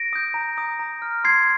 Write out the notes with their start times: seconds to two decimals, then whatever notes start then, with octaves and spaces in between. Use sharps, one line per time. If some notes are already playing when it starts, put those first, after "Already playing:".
Already playing: A#6 D7
0.13 D#6 G6
0.34 A#5
0.57 D#6 G6
0.79 A#5
1.02 F6
1.24 C6 G#6 C7